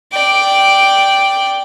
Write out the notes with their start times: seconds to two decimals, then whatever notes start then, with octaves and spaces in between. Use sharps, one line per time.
0.12 D5 G5